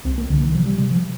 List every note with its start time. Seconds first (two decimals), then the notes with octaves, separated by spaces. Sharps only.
0.04 C2 C4
0.18 A#3
0.29 C2 D3
0.42 D#3
0.54 C3 F3
0.66 G3
0.78 C3 G3
0.91 F3